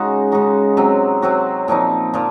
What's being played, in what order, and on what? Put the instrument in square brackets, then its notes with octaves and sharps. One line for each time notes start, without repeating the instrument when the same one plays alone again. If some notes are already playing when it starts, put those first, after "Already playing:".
Already playing: [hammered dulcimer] C#3 G#3 D#4 F#4
C#3 G#3 D#4 F#4
C3 F#3 C4 F#4
C3 F#3 C4 F#4
A#2 F3 C4 D#4
A#2 F3